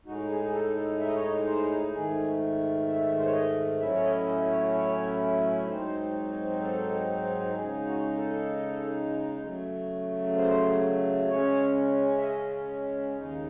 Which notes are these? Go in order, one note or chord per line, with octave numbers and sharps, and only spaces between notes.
A2 G#3 D#4 F#4
G#4
G#4
A4
A4
E5
D#5
C#5
D#5
C5
G#2 D#3 A3 G#4
E5
C5
C#5
D#5
A2 F#3 A3 C#4 E4 E5
C#5
D#5
D#5
C#5
C#5
G#2 F#3 C4 D#4 C5
A4
C#3 G#3 D#4 G#4
F#4
A4
C#3 F#3 A3
C5
C#3 G#3 C#4 C#5
E5
D#5
D#2 C#3 G#3 D#4